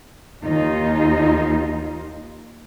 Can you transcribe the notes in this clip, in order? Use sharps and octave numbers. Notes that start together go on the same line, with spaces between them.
D#2 D#4 F4